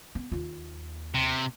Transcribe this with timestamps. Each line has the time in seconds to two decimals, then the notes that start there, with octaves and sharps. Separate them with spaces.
0.15 B3
0.32 D#2 F4
1.15 C3